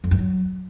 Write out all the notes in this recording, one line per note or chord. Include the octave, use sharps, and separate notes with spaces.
F2
G2
F#3